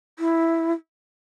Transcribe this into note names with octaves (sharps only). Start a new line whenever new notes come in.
E4